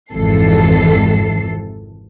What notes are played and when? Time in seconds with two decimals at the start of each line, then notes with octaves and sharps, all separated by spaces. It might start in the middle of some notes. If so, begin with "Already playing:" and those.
0.12 G#1 F2 C3 E3 A4 C7